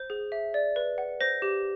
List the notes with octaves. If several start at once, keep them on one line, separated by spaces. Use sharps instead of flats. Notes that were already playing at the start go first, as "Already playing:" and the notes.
Already playing: C5
G#4
E5
D5
B4
F#5
C5 A#6
G4